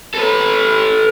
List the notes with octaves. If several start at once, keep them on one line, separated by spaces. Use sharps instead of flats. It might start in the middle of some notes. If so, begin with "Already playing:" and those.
A4 B4